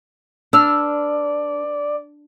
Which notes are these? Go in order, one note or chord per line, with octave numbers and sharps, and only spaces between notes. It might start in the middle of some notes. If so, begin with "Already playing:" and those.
D4 B4 D5 E6 F6